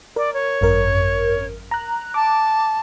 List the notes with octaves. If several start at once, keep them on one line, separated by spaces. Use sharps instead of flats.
A#4 D5
C#5
G#1 F#2 A#4
A#5 F#6
A5 D6